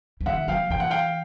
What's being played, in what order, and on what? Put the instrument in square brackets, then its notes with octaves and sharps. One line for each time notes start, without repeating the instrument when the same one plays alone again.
[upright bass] E3
[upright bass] D#3 [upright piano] E5 F#5
[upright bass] F3 [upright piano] F5 G5
[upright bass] E3 [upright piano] G5
[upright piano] F#5
F5 G5